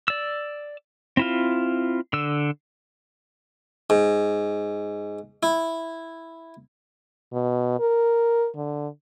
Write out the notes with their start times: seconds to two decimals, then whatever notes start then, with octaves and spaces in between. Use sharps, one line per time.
0.08 D5 E6
1.17 C4 E4 F4
2.13 D3 E6
3.90 G#2
5.43 E4
7.33 B2
7.80 A#4
8.56 D3